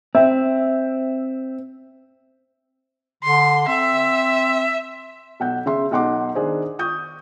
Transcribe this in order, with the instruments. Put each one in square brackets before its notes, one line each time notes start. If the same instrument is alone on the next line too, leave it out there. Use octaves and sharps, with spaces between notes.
[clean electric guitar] C4 [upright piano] E5
[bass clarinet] D3 [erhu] C6
[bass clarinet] C4 [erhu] E5
[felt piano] B1 F#5 G6
C#3 E5 C6
B1 D#4 F#5 C6 D6
D#3 D4 G#4 C5
C#6 D#6 G6